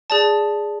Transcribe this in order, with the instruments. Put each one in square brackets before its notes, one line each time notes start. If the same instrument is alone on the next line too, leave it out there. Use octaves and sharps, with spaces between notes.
[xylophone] G#4 D5 A5